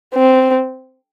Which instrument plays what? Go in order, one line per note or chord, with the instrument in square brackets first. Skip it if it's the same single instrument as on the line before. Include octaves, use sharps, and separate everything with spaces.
[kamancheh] C4